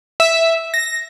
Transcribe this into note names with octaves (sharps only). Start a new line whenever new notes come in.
E5
A#6